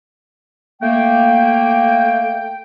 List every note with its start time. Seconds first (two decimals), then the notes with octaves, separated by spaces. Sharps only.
0.82 A3 A#3 G5